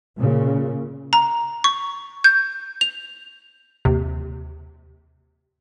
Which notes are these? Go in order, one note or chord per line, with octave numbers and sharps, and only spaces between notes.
A#2 C#3
A#5
C#6
G6
F7
D#2 C3